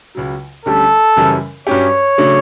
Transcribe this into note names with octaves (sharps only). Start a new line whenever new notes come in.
C#2 C#3 F#3
D2 D3 G3 C#4 G4 A4
F#2 C#3 E3 G3 C#4
G2 F#3 C#4 G4 C#5
C#3 F#3 A3 D4